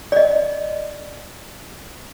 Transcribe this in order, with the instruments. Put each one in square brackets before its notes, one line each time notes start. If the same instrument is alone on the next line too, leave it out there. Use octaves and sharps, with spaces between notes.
[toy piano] D5 D#5